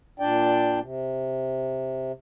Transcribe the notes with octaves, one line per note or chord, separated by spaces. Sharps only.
A#2 D4 D5 G5
C3